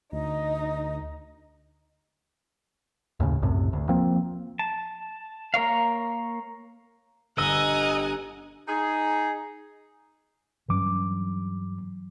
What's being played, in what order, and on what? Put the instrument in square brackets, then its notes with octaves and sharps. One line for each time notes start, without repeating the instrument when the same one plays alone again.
[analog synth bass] D2 [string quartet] D#4 [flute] D#5
[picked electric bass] D#2 A2 C#3
C2 F#2 A2 C3
D2
F3 A#3 C4
[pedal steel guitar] A5
A#3 A#4 C#5 F5
[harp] G1 [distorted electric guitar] D#5 [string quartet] F#5 G#5 A#5 [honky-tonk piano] E6
[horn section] D#4 G#4
[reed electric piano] G2 D6 [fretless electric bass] E3 F#3 C#4